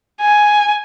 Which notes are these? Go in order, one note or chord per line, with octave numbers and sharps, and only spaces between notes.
G#5